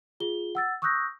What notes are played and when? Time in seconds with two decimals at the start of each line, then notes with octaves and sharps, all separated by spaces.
0.20 F4 G#4 G7
0.55 F#5 E6 A6
0.82 C#6 D#6 E6 F#6 G6 A#6